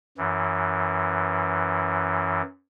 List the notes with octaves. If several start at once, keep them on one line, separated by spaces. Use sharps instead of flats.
F#2 E3